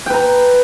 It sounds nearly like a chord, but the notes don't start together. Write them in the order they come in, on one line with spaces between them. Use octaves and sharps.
G5 B4 A#5